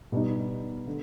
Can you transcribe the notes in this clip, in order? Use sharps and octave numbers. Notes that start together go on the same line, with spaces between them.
B2 G3 B3 D#4
D3